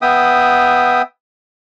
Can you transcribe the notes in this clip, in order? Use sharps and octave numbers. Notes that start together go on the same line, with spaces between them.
B3 E5 G5 D#6